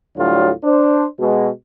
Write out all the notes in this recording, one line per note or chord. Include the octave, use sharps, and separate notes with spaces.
D2 A2 F#3 G3 D4 F4
D4 C5
B2 G#3